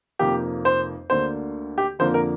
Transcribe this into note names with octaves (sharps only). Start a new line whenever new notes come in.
F1 F2 F3 A#3 G4
C5
D2 D3 A#3 C5
G4
F2 D3 F3 A#3 C5
A#4